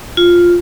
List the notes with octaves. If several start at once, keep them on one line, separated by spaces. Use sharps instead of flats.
F4